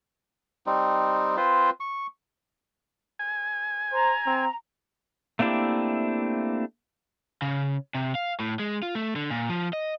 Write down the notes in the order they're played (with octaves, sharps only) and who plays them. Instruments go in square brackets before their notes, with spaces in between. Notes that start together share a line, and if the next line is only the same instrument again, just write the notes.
[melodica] G3 C4 D#4
C4 F4 B4 C5
C#6
[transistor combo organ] G#5
[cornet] C5 [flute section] A#5
[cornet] C4
[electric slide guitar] A3 A#3 C4 D4 E4 G4
[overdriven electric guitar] C#3
C3
F5
A2
G#3
F4
A3
D3
A#2
F3
D#5